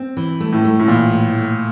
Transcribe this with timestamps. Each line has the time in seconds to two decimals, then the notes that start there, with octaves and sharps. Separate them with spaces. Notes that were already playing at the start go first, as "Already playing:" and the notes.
Already playing: C4
0.17 E3
0.40 A3
0.52 A2
0.64 A3
0.79 A2
0.88 A#2 E3
1.11 A2
1.35 A3